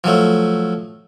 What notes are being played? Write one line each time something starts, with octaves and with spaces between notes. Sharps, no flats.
F3 F#3 A3